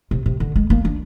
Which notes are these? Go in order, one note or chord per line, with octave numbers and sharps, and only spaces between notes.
C3
C3
D3
G#3
A#3
D4